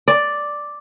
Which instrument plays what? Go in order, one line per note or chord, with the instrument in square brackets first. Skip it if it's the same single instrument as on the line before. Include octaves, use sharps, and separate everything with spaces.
[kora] D5